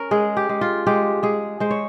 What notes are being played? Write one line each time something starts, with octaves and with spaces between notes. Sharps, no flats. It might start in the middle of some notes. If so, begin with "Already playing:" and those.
Already playing: C#4 A#4
G#3 G#4
G4
G#3
F4
G#3 G4
G#3 G#4
G#3 C5
C#5